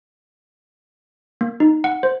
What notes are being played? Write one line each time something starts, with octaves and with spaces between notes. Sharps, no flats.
A#3
D#4
F#5
C5